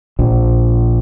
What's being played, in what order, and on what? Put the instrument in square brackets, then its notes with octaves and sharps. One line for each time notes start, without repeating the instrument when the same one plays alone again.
[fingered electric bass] A#1